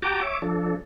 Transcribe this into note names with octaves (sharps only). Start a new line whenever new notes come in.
F#4 G4 G5 A5 A#5 D6
C#5 E5 D6
F3 D4 A4